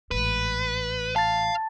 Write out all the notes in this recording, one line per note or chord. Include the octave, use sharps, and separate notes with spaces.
A1 G#2 B4
F5 A5 A6